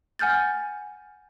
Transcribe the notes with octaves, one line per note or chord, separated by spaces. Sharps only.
F#5 G#5 F6 G6 A6